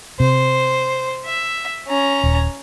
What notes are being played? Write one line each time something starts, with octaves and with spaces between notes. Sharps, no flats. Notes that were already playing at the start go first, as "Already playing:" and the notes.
C3 C5
E5
C#4 A#5
D#1